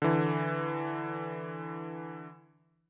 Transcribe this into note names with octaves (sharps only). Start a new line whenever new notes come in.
D3 E3